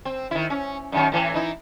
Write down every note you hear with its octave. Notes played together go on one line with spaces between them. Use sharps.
C4
D#3 E4
C#4
F#2 D#3 C#4
A2 E3
E3 D#4 E4